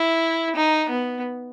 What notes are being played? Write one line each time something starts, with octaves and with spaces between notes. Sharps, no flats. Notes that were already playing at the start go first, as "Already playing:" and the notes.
Already playing: E4
D#4
B3